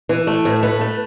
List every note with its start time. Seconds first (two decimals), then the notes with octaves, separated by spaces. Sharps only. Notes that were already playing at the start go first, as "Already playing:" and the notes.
0.09 E3
0.27 A3
0.45 A2
0.63 A3 B4
0.81 A3